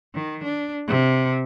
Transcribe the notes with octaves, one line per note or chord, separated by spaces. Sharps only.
D#3
D4
C3